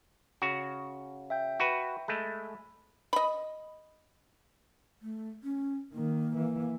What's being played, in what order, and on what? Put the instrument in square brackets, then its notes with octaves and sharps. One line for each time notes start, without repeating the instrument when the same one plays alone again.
[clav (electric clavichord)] C#3 F#4
[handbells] E5 G5 G6
[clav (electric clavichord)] F#4 B4
[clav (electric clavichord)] G#3 A3 [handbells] B5
[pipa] D#5 B5
[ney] A3
C#4
[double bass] D#3 [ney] A#3
[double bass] E3